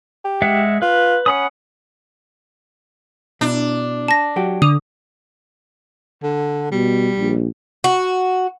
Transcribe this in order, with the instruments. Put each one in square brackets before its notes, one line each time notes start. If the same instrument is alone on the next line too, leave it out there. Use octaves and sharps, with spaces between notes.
[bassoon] G4
[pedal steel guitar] G#3 E5 F#5
[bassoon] F4 [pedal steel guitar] B4
[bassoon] C#4 [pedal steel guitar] F#5 B5 D#6
[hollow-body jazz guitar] B2 E4 [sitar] D4
[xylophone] A5 A#6
[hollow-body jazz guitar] F#3 F#4 G4
[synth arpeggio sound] D3 [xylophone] D#6
[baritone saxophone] D3
[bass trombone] B2 [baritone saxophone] G3
[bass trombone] A#1
[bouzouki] F#4